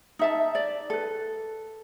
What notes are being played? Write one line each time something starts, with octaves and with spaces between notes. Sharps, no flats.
D#4 E5 A5
D5
A4 B4